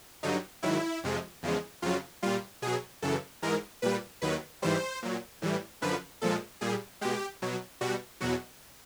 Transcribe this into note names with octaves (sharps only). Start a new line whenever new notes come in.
G2 D3 F#3 D#4
G#2 D#3 F#3 E4
F2 C3 F3 G#3
E2 C#3 F3 G#3
F2 C#3 F#3 F4
A#2 G3 F4
B2 F#3 G#4
F#2 C#3 E3 A4
G#2 E3 G#3 A#4
A#2 G3 B4
D#2 D#3 F#3 B4
G#2 E3 G3 C5
A#2 F#3
A2 E3 G3
F#2 D3 F3 B4
A#2 F3 G#3 A4
A#2 G3 G#4
B2 G#3 G4
B2 F#3
B2 G3 F#4
E2 B2 F#3 F#4